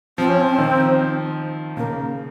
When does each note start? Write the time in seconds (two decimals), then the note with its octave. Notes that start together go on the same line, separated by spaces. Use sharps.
0.18 F3 C4
0.29 C#4
0.40 C4
0.58 D#3
1.77 C#3 A#3